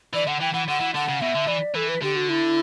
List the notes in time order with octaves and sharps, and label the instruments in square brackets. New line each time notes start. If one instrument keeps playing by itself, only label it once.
[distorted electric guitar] E3 [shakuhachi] D5
[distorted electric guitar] D3 [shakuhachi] F#5
[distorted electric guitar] E3 [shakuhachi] G5
[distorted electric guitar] E3 [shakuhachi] F#5
[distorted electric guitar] D3 [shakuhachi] F#5
[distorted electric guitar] E3
[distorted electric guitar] D3 [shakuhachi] F#5
[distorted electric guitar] C#3
[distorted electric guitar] B2 [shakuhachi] E5
[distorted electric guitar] D3
[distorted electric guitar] E3 [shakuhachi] D5
[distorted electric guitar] E3 [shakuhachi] A4
[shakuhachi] B4
[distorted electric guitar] D3 [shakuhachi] G4
[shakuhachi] F#4
E4